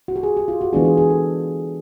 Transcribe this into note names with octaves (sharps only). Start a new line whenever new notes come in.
F#4
G4
G#4
G4
F4
F#4
E3 G#3 B3 D4 F4 G#4
G#4
G#4
A4